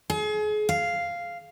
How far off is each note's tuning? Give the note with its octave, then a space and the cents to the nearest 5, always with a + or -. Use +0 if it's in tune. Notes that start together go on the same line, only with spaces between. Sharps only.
G#4 +35
F5 -5